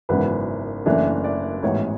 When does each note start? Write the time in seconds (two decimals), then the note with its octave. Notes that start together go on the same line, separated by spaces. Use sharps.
0.09 G#1 F#2 C#3 E3 B3 B4
0.86 F#1 F#2 E3 A3 D4 E5
1.24 D5
1.63 A1 G#2 E3 B3 C#5